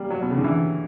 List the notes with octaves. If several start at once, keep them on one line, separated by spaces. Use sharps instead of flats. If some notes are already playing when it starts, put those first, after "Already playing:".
Already playing: G3 A#3
F#3
B2
C#3
D3
E3